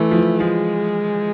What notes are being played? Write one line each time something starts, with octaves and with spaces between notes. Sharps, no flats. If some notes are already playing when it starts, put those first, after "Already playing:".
Already playing: E3 A3
F3
E3
F3 G#3